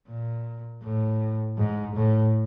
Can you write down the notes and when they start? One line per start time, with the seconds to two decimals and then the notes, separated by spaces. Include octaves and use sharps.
0.09 A#2
0.83 A2
1.58 G#2
1.95 A2